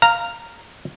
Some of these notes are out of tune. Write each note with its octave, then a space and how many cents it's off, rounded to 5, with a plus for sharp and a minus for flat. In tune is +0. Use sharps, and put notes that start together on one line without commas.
F5 -5 A#5 -10